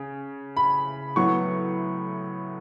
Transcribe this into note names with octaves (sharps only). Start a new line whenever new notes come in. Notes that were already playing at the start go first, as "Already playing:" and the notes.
Already playing: C#3
B5
A2 F#3 B3 C#6